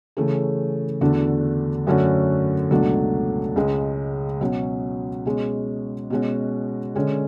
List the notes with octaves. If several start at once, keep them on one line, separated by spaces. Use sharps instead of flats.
C#3 E3 A3 C#4 G#4
E2 D3 A3 D4 F#4
F#2 D3 A3 C#4 F#4
C#2 B2 F#3 A3 D4
C#2 C#3 G#3
B2 F#3 C#4
B2 G#3 C#4 G#4
B2 G#3 C#4 F#4
D3 G#3 C#4